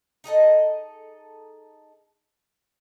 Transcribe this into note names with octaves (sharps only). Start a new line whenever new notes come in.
D#4 G#4 A4 D#5